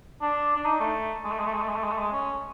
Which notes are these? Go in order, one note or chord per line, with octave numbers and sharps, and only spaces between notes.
D4
D4
D#4
A3
G#3
A3
G#3
A3
G#3
A3
G#3
A3
G#3
A3
G#3
C#4